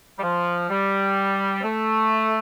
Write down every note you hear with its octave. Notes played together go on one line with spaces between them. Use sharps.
G3
F3
G3
C4
A3